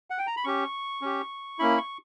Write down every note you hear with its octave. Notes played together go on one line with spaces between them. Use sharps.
F#5
G5
A#5
B5
C#4 G4 C#6
C#4 G4
A#3 C#4 E4 B5
C#6